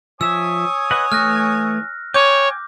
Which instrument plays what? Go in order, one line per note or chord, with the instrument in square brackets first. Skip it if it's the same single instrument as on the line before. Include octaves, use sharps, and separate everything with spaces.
[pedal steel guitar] F3 E5 [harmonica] C#5 G#5 D#6 [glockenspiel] E6
[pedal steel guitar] B4 D#5 F#5
[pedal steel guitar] E3 A3 [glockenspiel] F6 F#6 A#6
[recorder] C#5 [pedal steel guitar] G5 G#5 [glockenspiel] D6 G6